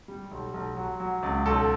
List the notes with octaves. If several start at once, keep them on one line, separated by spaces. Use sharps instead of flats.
G3
B1
B1
F#3
F#3
C#2
B1 A4